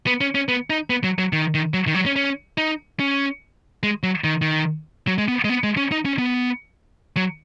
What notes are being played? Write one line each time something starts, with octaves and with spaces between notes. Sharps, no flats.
B3
C#4
C#4
B3
D#4
B3
F#3
F#3
D#3
D#3
F#3
D#3
F#3
C#4
C#4
D#4
C#4
G#3
F#3
D#3
D#3
F#3
G#3
B3
G#3
B3
G#3
C#4
D#4
C#4
B3
F#3